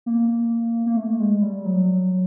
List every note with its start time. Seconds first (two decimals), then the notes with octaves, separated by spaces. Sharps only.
0.06 A#3
0.86 A#3
0.97 A3
1.20 G#3
1.42 G3
1.65 F#3